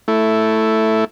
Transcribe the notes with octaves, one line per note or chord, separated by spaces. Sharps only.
A3 E4